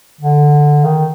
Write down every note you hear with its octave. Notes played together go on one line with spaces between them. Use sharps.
D3
D#3